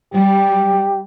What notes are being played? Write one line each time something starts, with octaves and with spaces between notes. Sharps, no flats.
G3 G4